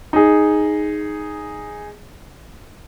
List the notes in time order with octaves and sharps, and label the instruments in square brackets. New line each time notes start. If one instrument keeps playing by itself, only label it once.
[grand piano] D#4 G#4